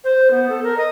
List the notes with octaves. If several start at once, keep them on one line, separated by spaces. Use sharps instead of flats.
C5
B3
A4
A#4
D#5